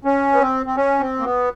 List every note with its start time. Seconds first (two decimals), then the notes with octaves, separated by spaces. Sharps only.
0.05 C#4
0.32 B3
0.40 C4
0.66 C4
0.76 C#4
1.00 C4
1.20 A#3
1.24 B3